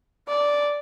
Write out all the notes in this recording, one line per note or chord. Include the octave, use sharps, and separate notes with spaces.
D5